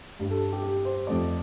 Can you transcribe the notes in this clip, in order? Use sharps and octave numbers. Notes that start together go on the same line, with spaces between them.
G2 G3
A4
G4
G4
C5
F2 F3 A3 D5